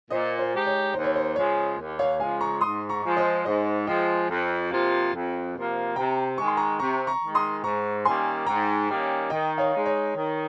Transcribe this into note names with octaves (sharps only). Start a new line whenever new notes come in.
A#2 C5 D#5
C5
G#3 D#4 G4
C#5
D#2 C5
C#5
C5
C#3 F3 G#3 C#5
D#2
C#5 F5
C#3 F3 G#3 F5 G#5
A#5 C#6
G#2 C6 D#6
A#5 C#6
F3 G#3
C5 D#5
G#2 C5 D#5
F3 G#3 D#5 G5
F2
C3 F3 A#3 F4
F2
C3 F3 A#3 F4
C3 G5 A#5
D#3 G#3 C#6
C6
A#5 C#6
C3 A#5 C#6
A#5 C#6
D#3 G#3
C6 D#6
G#2 A#5 C#6
D#3 G3 A#3 C#4 G#5 C6
G#2 G5 A#5
D#3 G3 A#3 C#4
D#3 D#5 G5
C#5 F5
G#3 D#4
C#5
D#3